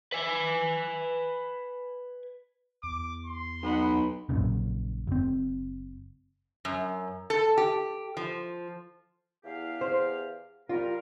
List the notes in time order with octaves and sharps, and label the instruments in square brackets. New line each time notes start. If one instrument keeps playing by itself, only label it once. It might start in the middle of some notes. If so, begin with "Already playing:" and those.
[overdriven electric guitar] B4 G#5
[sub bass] E2 [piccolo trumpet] D6
[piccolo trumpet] C6
[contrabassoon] B1 [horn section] D#5 F#5 B5
[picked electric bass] A#1 F#2 A#2 C#3
F#1 C4
[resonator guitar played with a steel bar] F#2
A4
G4
F3
[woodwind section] E2 G4 F5
[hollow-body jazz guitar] C5
[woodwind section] G3 A#4 [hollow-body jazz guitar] F4